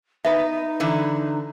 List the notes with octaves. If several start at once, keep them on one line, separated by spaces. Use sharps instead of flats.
B3 D#4 B4 E5
D3 E3 E4